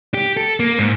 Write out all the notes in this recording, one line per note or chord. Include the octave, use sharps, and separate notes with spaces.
G4
A4
A#3
G#2